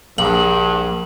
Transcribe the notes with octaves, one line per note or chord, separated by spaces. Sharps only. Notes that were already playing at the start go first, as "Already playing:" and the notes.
A#1 G2 F#7